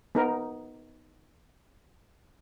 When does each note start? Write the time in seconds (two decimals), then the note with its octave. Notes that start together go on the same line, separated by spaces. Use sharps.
0.15 B3 D#4 A#4